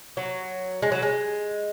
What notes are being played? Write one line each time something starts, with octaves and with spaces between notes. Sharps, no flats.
F#3
G#3
F#3
G#3